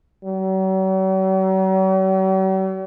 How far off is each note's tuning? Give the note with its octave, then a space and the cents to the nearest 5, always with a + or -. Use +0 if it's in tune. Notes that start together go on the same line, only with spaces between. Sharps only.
F#3 +45